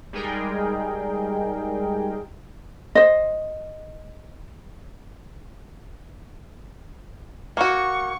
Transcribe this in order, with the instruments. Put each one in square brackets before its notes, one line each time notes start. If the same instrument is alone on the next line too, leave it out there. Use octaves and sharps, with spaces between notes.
[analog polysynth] G3 G#3 D#4 G#4 A#4 G5
[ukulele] C5 D#5
[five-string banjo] A#3 F#4 [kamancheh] C#6